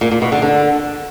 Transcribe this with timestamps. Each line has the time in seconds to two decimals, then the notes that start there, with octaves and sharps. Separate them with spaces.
0.01 A#2
0.11 A#2
0.22 B2
0.32 D3
0.42 D3